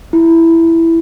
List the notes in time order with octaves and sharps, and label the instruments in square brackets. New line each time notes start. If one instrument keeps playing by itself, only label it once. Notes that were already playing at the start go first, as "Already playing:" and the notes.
[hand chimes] E4